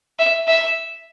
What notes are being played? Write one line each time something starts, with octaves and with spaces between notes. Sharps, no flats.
E5
E5